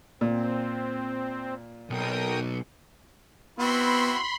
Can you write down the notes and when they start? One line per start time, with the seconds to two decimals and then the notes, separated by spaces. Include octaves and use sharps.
0.21 A#2 C4
1.90 B1 A#4 G5 D#6
3.59 B3 C4 E4 F#4 B5 C6